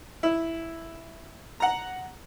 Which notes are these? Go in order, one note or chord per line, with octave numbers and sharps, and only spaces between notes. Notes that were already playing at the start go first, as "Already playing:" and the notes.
E4
F#5 A#5